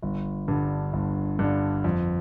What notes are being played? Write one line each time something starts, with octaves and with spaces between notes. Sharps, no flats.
G1
G2 D3
G1
G2 D3
F2